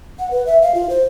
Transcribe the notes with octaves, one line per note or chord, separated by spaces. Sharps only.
F#5
B4
E5
F5
F4
C5